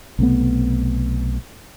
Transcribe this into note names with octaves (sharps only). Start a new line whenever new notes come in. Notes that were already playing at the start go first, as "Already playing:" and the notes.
B1 C3 A3 B3